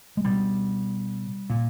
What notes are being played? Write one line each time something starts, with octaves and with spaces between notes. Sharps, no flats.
G#3
B2 G3
A#2